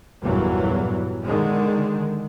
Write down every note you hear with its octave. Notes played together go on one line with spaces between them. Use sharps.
G1 E2 G2 A#2 E3 F#3
D3 D#3 G#3